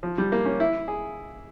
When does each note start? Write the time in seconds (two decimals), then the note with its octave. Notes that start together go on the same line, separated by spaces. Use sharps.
0.03 F3
0.18 G3
0.32 A#3
0.46 C#4
0.60 E4
0.88 G#4